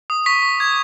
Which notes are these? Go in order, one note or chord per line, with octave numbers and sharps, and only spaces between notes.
D#6
C#6 B6
C#6
D6 G#6